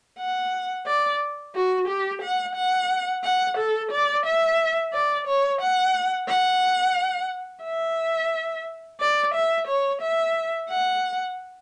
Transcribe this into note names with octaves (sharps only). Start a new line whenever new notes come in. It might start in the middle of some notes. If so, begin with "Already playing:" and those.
F#5
D5
F#4
G4
F#5
F#5
F#5
A4
D5
E5
D5
C#5
F#5
F#5
E5
D5
E5
C#5
E5
F#5